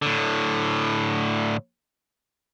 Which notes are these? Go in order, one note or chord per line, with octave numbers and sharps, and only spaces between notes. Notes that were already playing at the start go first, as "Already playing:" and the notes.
A2 D3